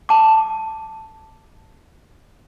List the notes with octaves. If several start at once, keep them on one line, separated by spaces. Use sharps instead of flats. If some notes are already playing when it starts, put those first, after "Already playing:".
A5 D6